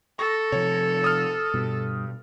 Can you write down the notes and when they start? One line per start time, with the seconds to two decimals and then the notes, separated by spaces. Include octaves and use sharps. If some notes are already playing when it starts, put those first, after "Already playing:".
0.19 A4 C#6 A#6
0.52 C3 F3 C#5
1.04 D#6 F6
1.54 G2 B2